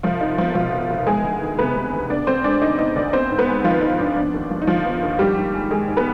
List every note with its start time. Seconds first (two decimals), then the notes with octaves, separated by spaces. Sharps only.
0.03 C2 F3 F4
0.21 C2 D#4
0.38 F3 B3 F4
0.55 B2 F3 F4
0.72 C2
0.90 C2
1.07 G#3 B3 G#4
1.24 D2
1.41 D#3
1.59 C3 B3 B4
1.76 B3
1.93 D2
2.10 B3 D4 D5
2.27 D2 C4 C5
2.44 G#3 D4 D5
2.62 D3 D#4 D#5
2.79 B3 D#4 D#5
2.96 D2 D4 D5
3.13 B3 C4 C5
3.30 G#2
3.38 B3 B4
3.47 G#3
3.64 D#3 F3 F4
3.81 B3 D#4
3.99 G#2 D4
4.16 B3 D4
4.34 D#2
4.51 F3
4.62 D#4
4.67 D3 F3 F4
4.85 B3
5.03 D#2
5.19 G#2 G3 G4
5.37 G#2
5.54 G#3
5.71 D#3 G#3 G#4
5.88 G#2
5.97 B3 B4